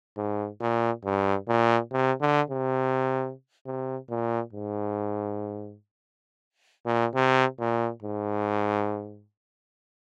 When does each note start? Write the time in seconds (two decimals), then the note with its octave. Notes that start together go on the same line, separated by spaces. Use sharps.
0.17 G#2
0.61 A#2
1.05 G2
1.48 A#2
1.92 C3
2.21 D3
2.50 C3
3.66 C3
4.10 A#2
4.53 G#2
6.86 A#2
7.15 C3
7.59 A#2
8.03 G#2